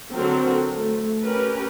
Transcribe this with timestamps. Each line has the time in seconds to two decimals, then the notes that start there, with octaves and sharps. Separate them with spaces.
0.14 D3 F#3 C4 F#4 A4 A#4
0.76 A3
1.22 C#4 G4 A#4 B4